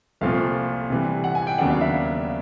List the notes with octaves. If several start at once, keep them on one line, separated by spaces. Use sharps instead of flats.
C2 A#2 F3 A3 C4 F5
C3 E3 G3
F#5
G#5
G5
D#2 C#3 F#3 B3 D4 F#5
F5
E5